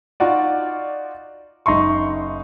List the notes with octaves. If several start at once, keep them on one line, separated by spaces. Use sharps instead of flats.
D#4 F4 F#4 D5
F#1 D#4 E5 C6 C#6